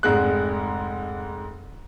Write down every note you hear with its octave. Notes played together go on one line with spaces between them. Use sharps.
F1 G#2 G#3 F#6